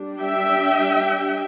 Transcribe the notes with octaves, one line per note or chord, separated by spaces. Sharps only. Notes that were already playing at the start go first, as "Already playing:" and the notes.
Already playing: G3 D4
E5 G5